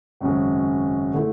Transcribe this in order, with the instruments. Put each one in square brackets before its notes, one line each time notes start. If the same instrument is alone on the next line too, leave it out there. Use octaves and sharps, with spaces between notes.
[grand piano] G#1 F#2 C#3 G#3
D3 A3 E4